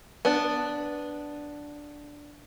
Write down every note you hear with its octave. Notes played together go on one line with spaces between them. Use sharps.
B3 D4